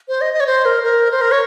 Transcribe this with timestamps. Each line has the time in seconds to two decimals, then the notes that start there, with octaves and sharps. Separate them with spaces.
0.08 C5
0.21 D#5
0.34 D#5
0.40 C#5
0.46 C5
0.65 A#4
0.84 A#4
1.11 C5
1.21 A#4
1.31 C#5